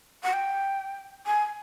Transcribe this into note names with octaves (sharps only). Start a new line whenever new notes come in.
F#5
G5
G#5